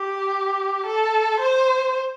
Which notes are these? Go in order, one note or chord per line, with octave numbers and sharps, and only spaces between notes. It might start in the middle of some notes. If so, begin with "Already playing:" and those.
Already playing: G4
A4
C5